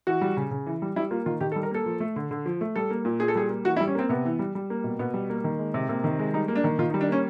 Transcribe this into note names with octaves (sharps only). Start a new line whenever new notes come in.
E3 F#4
G3
C#3
C#3
E3
G3
G3 E4
A#3 F4
D#3 F4
D#3 G4
A4
G3
A#4
A#3 A4
F3
A3
D3
D3
F3
A3
G3 A4
A#3
A#2
A#2 G#4
A4
G3 G#4
A#3
E3 F#4
E4
G3
C#4
A#3 C4
C3 B3
E3
G3
G3
A#3
B2
B2 B3
G3
A#3
D#3
G#3
C3
C3 A#3
D#3
G#3
G3 D#4
A#3
D4
D#3
D#3 F4
D#4
G3
D4
A#3 C#4